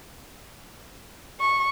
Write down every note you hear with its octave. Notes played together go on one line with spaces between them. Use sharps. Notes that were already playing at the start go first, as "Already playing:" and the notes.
C#6